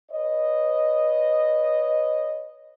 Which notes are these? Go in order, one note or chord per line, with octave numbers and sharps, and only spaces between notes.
B4 C#5 D#5